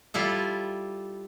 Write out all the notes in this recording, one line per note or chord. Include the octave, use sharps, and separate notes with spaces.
G3 E4 F4 A4